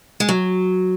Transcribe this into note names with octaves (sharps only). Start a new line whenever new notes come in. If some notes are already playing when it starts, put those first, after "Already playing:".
G#3
F#3